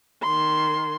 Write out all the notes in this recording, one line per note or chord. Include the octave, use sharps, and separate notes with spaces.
D#3 C6